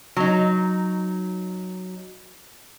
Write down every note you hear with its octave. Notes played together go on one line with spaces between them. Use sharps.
F#3 D#4